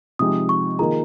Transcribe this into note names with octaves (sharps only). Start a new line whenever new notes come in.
C3 F3 G#3 D#4 G4 D#6
C#6
D#3 A#3 F4 G#4 A#5